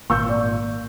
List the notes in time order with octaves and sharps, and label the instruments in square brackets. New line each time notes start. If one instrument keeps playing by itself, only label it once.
[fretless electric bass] G#1 A#2 [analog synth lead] A#3 [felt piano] C#6 E6 G6
[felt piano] D5